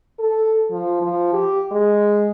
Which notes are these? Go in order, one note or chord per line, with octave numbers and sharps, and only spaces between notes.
A4
F3
F3
G4
G#3